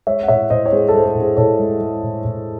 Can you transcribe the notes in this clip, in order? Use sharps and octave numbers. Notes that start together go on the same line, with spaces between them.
G#3 C#5 E5
F#5
A2 C#5 E5
A2 C5 D#5
C#5
G#3 G#4 C5
A4
G#3 C5
A4
A2
G#4 C5
A2 A4 C#5
G#3
G#3
A2
A2